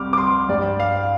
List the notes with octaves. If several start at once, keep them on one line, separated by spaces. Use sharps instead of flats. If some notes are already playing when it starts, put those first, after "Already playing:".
Already playing: C2 C3 G3 D6 F6
D6
C6
G2 G3 D5
F5